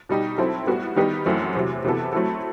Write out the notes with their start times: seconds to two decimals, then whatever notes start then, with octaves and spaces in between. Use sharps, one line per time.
0.09 B2 G3 D#4 G4
0.38 F#3 C4 E4 A4
0.67 A2 G3 B3 F#4
0.96 D#3 G3 B3 D#4 G4
1.25 F#2 E3 A3 C4 F#4
1.55 E2 C3 F#3
1.84 C3 E3 B3 F#4 A4
2.13 F#3 A3 C4 E4 A4